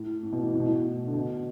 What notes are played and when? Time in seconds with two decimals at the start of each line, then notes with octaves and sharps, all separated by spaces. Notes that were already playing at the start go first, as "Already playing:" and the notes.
Already playing: A2
0.23 A2
0.33 B2
0.43 E3
0.54 A2
0.60 B2
0.68 A2
1.07 D3
1.14 B2